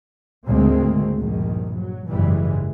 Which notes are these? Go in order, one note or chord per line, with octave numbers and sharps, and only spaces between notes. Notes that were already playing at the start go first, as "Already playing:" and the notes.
D2 G#2 C#3 G#3 A#3 C4
A#1 G2 D#3
F#3
F#1 G#2 E3 G3 G#3